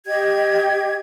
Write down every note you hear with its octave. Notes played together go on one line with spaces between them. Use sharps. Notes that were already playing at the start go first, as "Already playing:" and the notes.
G4 D#5 G5 G#6